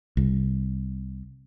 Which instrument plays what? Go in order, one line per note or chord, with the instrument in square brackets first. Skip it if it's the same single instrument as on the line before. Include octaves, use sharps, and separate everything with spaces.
[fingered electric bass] C2